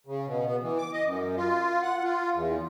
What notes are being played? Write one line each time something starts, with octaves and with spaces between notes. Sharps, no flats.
C#3
B2
B3
E3
D6
D#5
F#2
F4
F#5
F4
E2